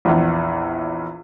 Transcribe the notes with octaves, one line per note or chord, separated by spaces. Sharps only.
A#1 E2